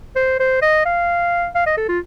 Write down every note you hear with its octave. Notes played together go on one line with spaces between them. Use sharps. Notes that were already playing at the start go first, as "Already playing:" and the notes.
C5
C5
D#5
F5
F5
D#5
A4
F4